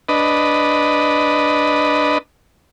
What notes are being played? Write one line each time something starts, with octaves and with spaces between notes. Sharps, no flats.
D4 B4 D#5